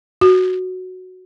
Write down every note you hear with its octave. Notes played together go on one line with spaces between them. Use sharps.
F#4